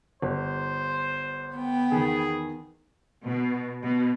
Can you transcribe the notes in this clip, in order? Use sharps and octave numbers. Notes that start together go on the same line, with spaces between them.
G1 C5
B3 G5
E2 D#3 G#4
B2
B2